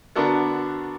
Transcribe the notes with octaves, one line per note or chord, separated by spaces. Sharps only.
D3 B3 D4 F#4 A4 A#4